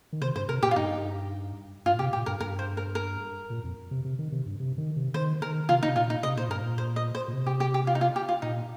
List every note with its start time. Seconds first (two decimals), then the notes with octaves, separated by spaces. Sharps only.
0.13 D#3
0.21 C3 C5
0.36 G2 C5
0.49 C3 A#4
0.63 A#2 G4
0.71 F4
0.76 G2 D#4
1.86 G2 F4
1.94 A#2
1.99 C3 G4
2.13 A#2 G4
2.26 G2 A#4
2.40 G2 A#4
2.59 C5
2.77 A#4
2.95 A#4
3.50 A#2
3.64 F2
3.91 C3
4.05 C3
4.19 D#3
4.32 C3
4.46 G2
4.60 C3
4.78 D#3
4.96 C3
5.14 D#3 C5
5.41 D#3 A#4
5.69 C3 F4
5.83 C3 D#4
5.96 A#2 F4
6.10 D#4
6.23 C3 D#5
6.36 A#2 C5
6.48 G2 A#4
6.61 A#2
6.78 C5
6.96 D#5
7.15 C5
7.28 A#2
7.33 C3
7.47 G4
7.60 G4
7.74 G4
7.87 F4
7.95 D#4
8.01 F4
8.16 G4
8.29 F4
8.42 A#2 D#4